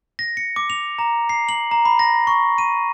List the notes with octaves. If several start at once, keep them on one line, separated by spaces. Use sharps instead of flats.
A#6
C#7
D6
F7
A#5
C7
F#7
A#5
B5
A#6
C#6
D#7